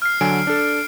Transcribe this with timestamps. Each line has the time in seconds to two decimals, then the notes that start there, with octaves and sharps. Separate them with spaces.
0.02 F6 C7
0.21 D3 F#3 G#5 D7
0.47 D4 A4